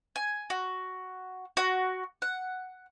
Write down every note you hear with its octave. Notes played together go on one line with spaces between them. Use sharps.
G#5
F#4
F#4
F#5